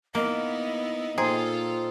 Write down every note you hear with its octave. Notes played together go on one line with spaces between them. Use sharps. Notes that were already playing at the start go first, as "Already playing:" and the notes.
A#3 B3 D#4 E4 D#5
A#2 D#4 F4 G#4 A4 C5 G5